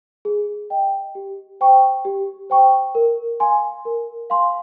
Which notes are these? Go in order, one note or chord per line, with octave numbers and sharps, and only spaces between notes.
G#4
D#5 G5
G4
C5 G5 C#6
G4
C5 G5 C#6
A#4
F5 G#5 C6
A#4
F5 G#5 C6